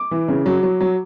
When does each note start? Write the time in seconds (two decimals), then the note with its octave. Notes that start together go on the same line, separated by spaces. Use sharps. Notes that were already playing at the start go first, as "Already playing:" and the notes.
Already playing: D6
0.11 E3
0.28 C#3
0.46 F#3
0.63 F#3
0.80 F#3